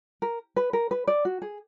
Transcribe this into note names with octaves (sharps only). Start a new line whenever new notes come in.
A#4
B4
A#4
B4
D5
F#4
G#4